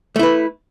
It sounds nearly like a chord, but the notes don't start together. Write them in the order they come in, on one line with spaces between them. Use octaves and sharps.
A3 E4 B4